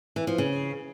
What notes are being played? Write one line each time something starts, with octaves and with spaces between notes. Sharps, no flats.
E3
F3
C#3